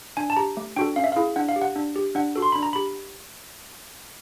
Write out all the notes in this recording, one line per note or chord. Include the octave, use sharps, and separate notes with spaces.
D4 G#5
A5
G4 A#5
A3
D4 F#4 A4 G5
C#4 F5
E5
E4 G#4 F5
D4 F#5
F5
G4
F#5
D4
G4
D4 F#5
F#4 A4
C6
D4 B5
A#5
G4 B5